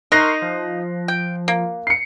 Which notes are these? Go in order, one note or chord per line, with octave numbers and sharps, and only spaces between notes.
D#4 A#4 C6 C#6 F#6 A#6 C7
F3
G5
A#3
C7 C#7